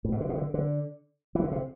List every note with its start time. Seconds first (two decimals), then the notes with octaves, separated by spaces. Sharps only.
0.05 A2
0.12 B2
0.21 D3
0.29 B2
0.37 D3
0.54 D3
1.35 E3
1.44 D3
1.52 C3